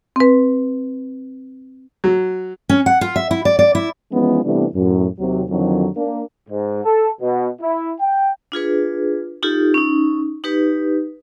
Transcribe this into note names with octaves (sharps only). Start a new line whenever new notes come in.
C4 B4
F#3
C#4
F#5
F4
E5
E4
D5
D5
E4
E3 F3 G#3 B3 C#4 D#4
C3 E3 G3 A3 B3 D4
F#2 A2
D#2 C3 F#3
F2 D3 D#3 F#3
A#3 D4
G#2
A4
B2
E4
G5
D4 F4 G#4 B4
D#4 F4 G4 A4
C#4 D#4
D#4 G4 B4